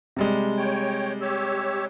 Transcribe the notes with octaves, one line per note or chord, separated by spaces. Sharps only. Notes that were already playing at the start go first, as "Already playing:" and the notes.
C3 G3 G#3
C#5 G5
G4 C#5 E6